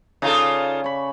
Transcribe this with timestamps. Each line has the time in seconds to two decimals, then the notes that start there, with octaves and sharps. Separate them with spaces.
0.22 C#3 D#4 F4 A4 D5 A5
0.84 C#5 B5